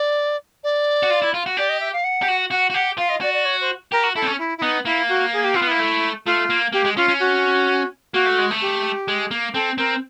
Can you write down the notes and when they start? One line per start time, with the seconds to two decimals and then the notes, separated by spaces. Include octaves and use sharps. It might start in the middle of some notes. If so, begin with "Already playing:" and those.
Already playing: D5
0.63 D5
1.03 F#4
1.10 F4
1.22 E4
1.34 F4
1.46 F#4
1.57 G4 D5
1.69 D#5
1.80 E5
1.93 F5
2.04 F#5
2.22 G4
2.28 F#4
2.51 F#4 F#5
2.70 F#4
2.74 G4 F#5
2.98 F4 F5
3.09 D#5
3.21 F#4 D5
3.33 D5
3.45 C#5
3.61 C5
3.92 G4 A#4
4.03 F#4
4.15 E4 A4
4.22 C4
4.27 C#4
4.38 E4
4.58 E4
4.62 B3 D#4
4.85 A#3 E4
5.08 F#4
5.33 G#4
5.44 G4
5.54 C4 F4
5.62 B3
5.67 A#3 E4
5.79 A3
6.26 A3 F4
6.50 A#3
6.72 A#3 G4
6.85 G#3
6.96 C#4 F4
7.08 C#4
7.19 F#4
8.13 A#3 F#4
8.26 A3
8.38 G#3
8.51 A3
8.61 G4
9.08 G#3
9.31 A#3
9.54 C4 A4
9.78 C4 A#4